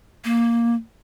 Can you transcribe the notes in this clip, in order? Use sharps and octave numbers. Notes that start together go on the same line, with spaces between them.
A#3